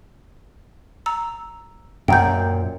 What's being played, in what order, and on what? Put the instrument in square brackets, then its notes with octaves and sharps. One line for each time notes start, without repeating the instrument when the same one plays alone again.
[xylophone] A#5 E6
[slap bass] F#2 A#2 [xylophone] G5 A#5 G6